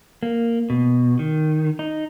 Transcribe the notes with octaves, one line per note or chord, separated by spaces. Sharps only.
A#3
B2
D#3
D#4